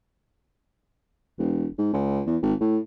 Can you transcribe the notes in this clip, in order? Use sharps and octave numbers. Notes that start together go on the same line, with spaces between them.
E1
G#2
C#2
E2
G#1
A2